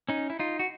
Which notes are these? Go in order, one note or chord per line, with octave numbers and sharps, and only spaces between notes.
C#4 D#4
E4
D#4 F4
F#4